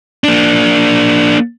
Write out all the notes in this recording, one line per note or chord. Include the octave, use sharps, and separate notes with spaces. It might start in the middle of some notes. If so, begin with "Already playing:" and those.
A#3 D4